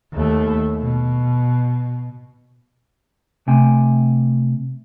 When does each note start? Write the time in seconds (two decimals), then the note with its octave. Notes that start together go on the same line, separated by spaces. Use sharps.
0.13 D#2 A3
0.82 B2
3.48 C3 A3 G5 G#5